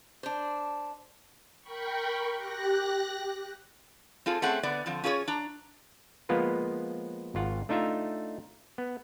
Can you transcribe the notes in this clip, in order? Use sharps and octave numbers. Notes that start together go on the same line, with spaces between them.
D4 C5
A#4 G5 B5 C#6
G4 F#6 A#6
C4 F4 G#4 A4
A3 C4 C#4 G#4 F#5
D3 B3 D5
D3 F3 C4
C#4 F4 G#4 C5 C#5
D4 A#5
F3 G#3 A#3 B3 F4 B4
G#1 F4 F#5
A3 D4 D#4 F4 E5 F5
B3